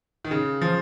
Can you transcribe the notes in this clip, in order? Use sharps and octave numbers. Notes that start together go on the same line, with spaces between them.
D#3
C#3
F3